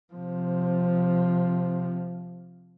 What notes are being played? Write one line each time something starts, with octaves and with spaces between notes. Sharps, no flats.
C3 F3